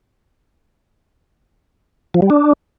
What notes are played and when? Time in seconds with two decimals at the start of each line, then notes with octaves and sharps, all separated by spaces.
2.14 F3
2.22 G3
2.30 D4